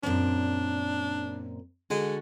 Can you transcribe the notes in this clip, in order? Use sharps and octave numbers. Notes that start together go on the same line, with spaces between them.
F#2 A#2 C4 D4
D3 G#3 F#4 A4